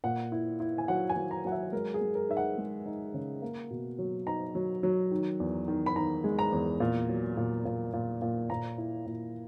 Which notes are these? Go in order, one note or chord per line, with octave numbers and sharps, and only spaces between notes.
A#2 F#5
E4
E4
G#5
F#3 F#5
G#5
F#3
A#5
F#3 F#5
E5
G#3 A#4
G#4
G#3
A#4
D#4 E5
F#5
G#3
D#4
C#3
A#3
B2
F#3
D#4 A#5
F#3
F#3
D#3
E2
D#3
B5
D#3 A#5
G#3
A#5
E2
A#2
F#3
A#2
A#2
A#2
A#2
A#2 A#5
E4
A#2